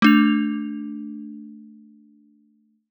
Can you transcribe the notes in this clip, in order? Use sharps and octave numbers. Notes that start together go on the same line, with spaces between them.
A3 D4 F7